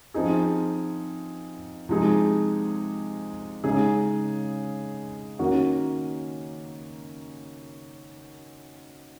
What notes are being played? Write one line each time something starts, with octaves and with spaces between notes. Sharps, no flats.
F3 C4 D#4 G#4
C3 F3 G#3 D#4 G#4
C#3 G#3 D#4 G#4
D#3 A#3 C#4 F#4